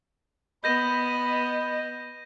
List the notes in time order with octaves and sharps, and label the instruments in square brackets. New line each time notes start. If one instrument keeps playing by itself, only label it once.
[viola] B3 [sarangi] D#5 [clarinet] B5 [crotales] G6 A#6 D#7